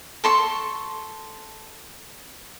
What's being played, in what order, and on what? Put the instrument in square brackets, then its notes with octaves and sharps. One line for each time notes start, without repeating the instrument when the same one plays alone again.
[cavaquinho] A4 C6 C#6